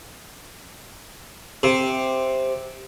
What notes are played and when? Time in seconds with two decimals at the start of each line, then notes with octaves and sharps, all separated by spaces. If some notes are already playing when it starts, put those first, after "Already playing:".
1.63 C3